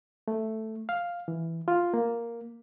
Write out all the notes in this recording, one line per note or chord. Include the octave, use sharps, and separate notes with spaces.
A3
F5
E3
F4
A#3